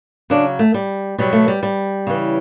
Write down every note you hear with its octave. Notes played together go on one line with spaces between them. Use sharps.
C#3 F#3 D4
A3
G3
B2 F#3 G3
A3
G3
G3
C#3 E3